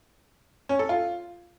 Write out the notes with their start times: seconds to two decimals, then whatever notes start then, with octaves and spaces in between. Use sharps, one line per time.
0.69 C#4
0.79 A4
0.89 F4